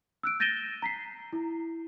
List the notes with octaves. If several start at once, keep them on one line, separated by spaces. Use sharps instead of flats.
E6 F#6 D7
G6 A6 A#6 D#7 E7 G7
A#5 B6 C7
E4